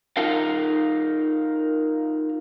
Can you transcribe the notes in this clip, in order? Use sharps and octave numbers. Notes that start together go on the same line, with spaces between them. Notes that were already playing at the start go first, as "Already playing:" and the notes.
D#4 F4 A#4 F5